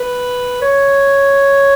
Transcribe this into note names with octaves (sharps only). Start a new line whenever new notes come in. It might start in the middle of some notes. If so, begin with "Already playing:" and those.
Already playing: B4
C#5